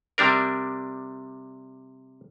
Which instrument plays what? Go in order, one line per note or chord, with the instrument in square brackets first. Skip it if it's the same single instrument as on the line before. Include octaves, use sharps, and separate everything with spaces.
[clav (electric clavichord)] C3 G3 D4 A#4